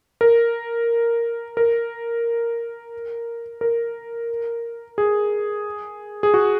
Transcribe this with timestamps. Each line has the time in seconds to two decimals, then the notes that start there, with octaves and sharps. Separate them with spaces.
0.21 A#4
1.57 A#4
3.61 A#4
4.98 G#4
6.23 G#4
6.34 F#4